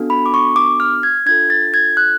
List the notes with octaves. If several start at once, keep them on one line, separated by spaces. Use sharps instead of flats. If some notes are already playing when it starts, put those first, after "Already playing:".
Already playing: B3 D4 F#4 A4
B5
D6
C#6
D6
F6
G#6
D4 F4 A4 G#6
A6
G#6
F#6